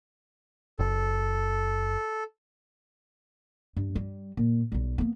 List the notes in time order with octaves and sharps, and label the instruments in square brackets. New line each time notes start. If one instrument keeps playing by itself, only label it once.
[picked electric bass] F#1 [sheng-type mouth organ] A4
[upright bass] G2
G3
A#2
B1 G3
A#3 B3